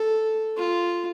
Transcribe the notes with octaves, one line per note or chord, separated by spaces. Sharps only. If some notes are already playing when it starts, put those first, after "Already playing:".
Already playing: A4
F4